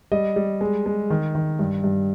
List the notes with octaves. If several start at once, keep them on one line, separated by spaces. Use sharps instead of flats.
G3 D#5
G3
G#3
G#3
D#3
D#3
G2
G2